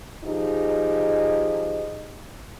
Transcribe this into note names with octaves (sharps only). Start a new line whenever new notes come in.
F3 D#4 G4 G#4 D#5